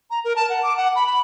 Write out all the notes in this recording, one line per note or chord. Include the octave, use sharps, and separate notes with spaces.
A#5
A#4
A5
F#5
D6
F#5
B5
B5